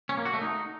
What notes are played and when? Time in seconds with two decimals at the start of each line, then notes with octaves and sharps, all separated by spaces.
0.09 C#4
0.17 A#3
0.25 F#4
0.34 A3
0.42 D#4